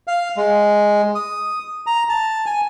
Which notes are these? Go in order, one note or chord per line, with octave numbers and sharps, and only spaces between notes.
F5
G#3
D#6
A#5
A5
G#5